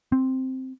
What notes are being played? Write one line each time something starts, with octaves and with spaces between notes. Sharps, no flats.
C4